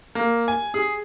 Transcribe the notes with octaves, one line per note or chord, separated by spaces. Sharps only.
A#3
G#5
G#4